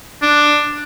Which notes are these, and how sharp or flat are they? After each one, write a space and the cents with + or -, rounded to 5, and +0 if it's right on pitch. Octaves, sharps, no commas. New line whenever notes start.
D4 +10